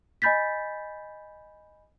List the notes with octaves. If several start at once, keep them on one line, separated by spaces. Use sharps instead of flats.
D#5 G#5 B5 G6 A6 B6